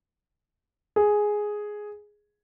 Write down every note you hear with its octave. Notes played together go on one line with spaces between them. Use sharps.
G#4